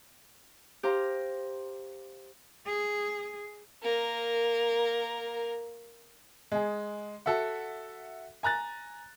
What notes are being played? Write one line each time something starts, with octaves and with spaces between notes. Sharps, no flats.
G4 C5 F5 A#5
G#4
A#3 A#4
G#3 G#4
F#4 A4 E5 F#5
G#5 A#5 F#6 A6